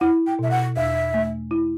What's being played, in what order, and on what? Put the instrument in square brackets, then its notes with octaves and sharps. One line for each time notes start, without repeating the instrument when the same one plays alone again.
[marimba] E4 [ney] F#5
[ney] G5
[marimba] B2 [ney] E5
[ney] F#5
[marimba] E2 [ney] E5
[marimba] A3
E4